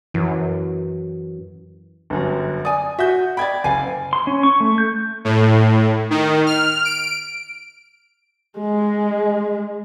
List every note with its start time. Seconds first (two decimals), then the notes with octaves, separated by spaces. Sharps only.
0.14 F#2 E3
2.10 G1 F#2
2.65 D5 G#5 D#6
2.99 F#4 E5 G6
3.37 D5 D#5 G5 B5 G#6
3.64 F#1 F5 G#5
4.13 C6
4.27 C#4
4.43 C#6
4.60 A3
4.78 G6
5.25 A2
6.10 D#3
6.46 F6
6.85 D7
8.59 G#3